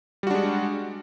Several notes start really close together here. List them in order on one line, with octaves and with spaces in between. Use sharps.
G3 F#4 D4 G#3